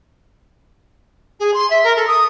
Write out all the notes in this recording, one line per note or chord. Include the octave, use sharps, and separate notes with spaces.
G#4
C6
E5
A#4
A4
D#6